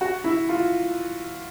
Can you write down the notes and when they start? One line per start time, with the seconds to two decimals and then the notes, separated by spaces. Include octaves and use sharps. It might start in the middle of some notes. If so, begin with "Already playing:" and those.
0.01 F#4
0.24 E4
0.49 F4